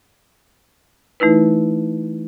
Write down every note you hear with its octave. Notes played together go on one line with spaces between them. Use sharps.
E3 A3 D#4 E4 B4